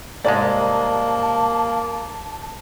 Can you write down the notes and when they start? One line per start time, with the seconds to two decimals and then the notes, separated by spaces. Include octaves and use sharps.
0.25 C2 G#2 G#3 A#3 D5 A5